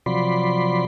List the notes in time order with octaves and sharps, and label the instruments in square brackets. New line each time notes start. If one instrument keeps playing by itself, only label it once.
[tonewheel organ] C3 F3 F#3 D5 B5 C6